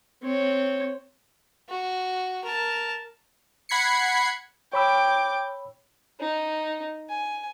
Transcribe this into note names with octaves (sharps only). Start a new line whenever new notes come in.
C4 C#5
F#4
A#4 A5
F#5 B5 G#6 C7 C#7
C#5 G5 B5 D6 E6
D#4
G#5